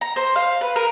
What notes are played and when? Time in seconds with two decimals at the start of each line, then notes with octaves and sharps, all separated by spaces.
0.01 A#5
0.16 C5
0.36 F5
0.61 B4
0.76 A#4